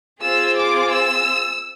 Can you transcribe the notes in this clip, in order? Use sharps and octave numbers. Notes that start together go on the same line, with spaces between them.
C4 F4 G#4 E6
D6
E6